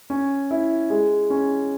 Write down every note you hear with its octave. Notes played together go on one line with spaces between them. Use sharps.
C#4
E4
G#3
C#4